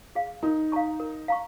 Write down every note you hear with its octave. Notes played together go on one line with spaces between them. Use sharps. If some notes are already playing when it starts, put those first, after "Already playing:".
G#4 F5
D#4 A#4
F5 A#5 C#6
A#4
F5 A#5 C#6